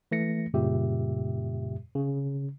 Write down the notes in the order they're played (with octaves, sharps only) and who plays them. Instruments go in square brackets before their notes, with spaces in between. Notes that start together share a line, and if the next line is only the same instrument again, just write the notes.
[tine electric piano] E3 A3 A#6 C#7
F#2 A#2 C#3 G3 G4 E5
C#3